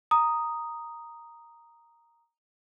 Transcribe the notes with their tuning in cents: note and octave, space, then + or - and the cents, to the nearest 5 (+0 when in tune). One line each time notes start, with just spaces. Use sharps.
A#5 +0 D#6 +0